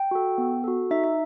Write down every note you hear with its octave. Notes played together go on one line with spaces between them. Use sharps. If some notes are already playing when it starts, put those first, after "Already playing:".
Already playing: G5
F#4 A4
B3
F#4 A4
D#4 E5
E5